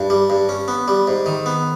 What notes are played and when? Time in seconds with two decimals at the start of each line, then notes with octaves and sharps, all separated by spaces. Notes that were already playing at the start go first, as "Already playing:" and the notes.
Already playing: G2
0.10 G3
0.30 G2
0.49 C#4
0.68 B3
0.88 G3
1.08 G#2
1.26 D#3
1.46 B3